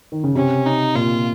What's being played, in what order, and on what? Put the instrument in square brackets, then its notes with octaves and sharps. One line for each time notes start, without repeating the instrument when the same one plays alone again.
[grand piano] D#3
C#3
[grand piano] C3 [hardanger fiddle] C#4
[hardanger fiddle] D#4
[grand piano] A#2 [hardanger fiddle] F4